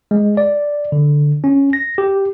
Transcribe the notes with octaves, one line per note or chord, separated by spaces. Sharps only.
G#3
D5
D3
C#4
A#6
G4